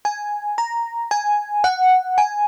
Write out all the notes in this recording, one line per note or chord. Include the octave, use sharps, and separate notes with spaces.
G#5
A#5
G#5
F#5
G#5